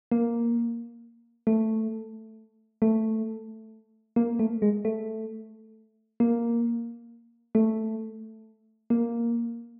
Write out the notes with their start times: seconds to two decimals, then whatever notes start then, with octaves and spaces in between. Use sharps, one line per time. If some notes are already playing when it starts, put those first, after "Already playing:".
0.12 A#3
1.47 A3
2.82 A3
4.16 A#3
4.39 A3
4.62 G#3
4.85 A3
6.20 A#3
7.55 A3
8.90 A#3